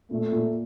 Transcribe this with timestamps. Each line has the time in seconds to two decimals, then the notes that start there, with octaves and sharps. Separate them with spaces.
0.11 A#2 A3
0.32 A#2